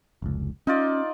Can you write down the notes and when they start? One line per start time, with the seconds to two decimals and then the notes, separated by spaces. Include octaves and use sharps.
0.22 F1 C#2
0.67 C#4 D#4 F4 D5